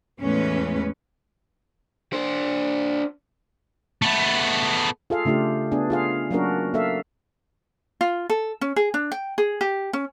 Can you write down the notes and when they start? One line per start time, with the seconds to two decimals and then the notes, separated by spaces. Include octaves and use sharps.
0.21 E2 A2 G#3 A3 C#4 B4
2.13 D4 C5
4.02 A3 B3
5.10 F4 G#4 A4 F5
5.25 C#3 A3 D4 F4 G4
5.72 B3 D4 G#4
5.90 F4 G#4 F5
6.31 F#3 A#3 C#4 D4 F#4 A#4
6.74 A#3 A4 E5 F5
8.01 F4
8.30 A4
8.61 C#4
8.76 G#4
8.94 D4
9.12 G5
9.38 G#4
9.61 G4
9.93 C#4